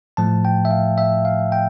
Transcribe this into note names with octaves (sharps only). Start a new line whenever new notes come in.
A2 F3 A3 A5
G5
E5
F5
E5
F5
G5